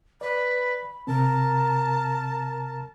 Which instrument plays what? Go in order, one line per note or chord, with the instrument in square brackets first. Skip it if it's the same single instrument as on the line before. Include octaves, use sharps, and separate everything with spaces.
[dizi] B4 [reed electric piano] D5 [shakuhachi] B5
[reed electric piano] C3 C4 [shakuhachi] A#4 [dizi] A5